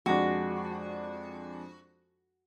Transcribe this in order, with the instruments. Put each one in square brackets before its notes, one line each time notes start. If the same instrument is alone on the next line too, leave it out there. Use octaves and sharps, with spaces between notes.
[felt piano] F2 G#3 D4 [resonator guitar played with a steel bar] F#4